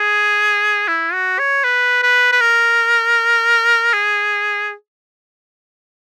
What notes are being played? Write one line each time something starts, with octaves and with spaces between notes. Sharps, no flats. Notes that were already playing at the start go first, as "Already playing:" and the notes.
Already playing: G#4
E4
F#4
C#5
B4
B4
B4
A#4
G#4